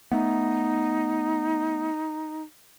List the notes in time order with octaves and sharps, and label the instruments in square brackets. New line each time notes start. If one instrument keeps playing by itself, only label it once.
[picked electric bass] A3 B3 [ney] D#4